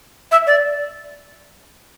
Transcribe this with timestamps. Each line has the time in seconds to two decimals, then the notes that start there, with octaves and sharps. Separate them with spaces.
0.32 E5
0.47 D5